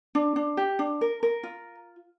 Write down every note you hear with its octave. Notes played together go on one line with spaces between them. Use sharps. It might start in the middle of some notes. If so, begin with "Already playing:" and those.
D4
D4
G4
D4
A#4
A#4
F4